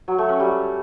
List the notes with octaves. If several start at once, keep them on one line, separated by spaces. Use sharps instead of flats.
F#3
A3
C#4
G3